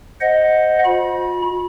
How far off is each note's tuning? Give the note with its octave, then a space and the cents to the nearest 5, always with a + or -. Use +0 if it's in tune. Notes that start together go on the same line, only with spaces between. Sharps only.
C5 +0 D#5 +0 F#5 -5
F4 +40 B5 -35